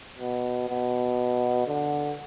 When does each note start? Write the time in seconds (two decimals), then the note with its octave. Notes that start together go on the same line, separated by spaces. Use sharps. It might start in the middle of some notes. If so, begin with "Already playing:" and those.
0.18 B2
0.69 B2
1.67 D3